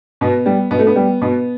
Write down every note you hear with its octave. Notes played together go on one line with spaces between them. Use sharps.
B2 B3
G3
B2 B3
A3
B3
G3
B2 B3